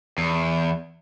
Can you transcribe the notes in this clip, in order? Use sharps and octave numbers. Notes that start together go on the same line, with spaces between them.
E2